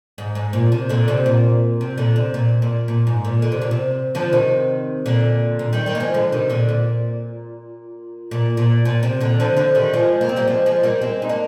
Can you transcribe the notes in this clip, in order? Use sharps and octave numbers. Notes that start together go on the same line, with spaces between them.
G#2
G#2
A#2
C3
A#2 D3
C3
A#2
C3
A#2 D3
C3
A#2
A#2
A#2
G#2
A#2
D3
C3
A#2
C3
D3 F3
C3 D#3
A#2 D3
A#2
D#3 G3
D#3 G3
A#3
F3 G#3
D3 F3
C3 D#3
A#2 D3
A#2
A#2
A#2
A#2
C3
A#2 D3
D3 F3
D3 F3
D#3 G3
F3 G#3
A#3
C4
G3 A#3
F3 G#3
F3 G#3
G3 A#3
G#3 C4
D#4
A#3 D4